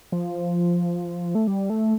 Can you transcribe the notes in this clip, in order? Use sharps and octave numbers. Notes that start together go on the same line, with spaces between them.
F3
A3
G3
A3